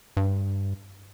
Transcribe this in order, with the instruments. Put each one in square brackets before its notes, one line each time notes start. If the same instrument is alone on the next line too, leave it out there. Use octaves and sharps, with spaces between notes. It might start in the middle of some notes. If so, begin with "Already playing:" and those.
[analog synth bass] G2